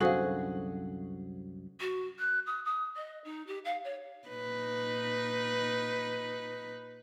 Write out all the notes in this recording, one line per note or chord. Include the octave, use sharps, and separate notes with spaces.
C2 F#2 D3 F#4 G#4 A4 C5 F5
F#4
F#6
D#6
D#6
D#5
D#4
G4
F5
C#5
A#2 D#4 B4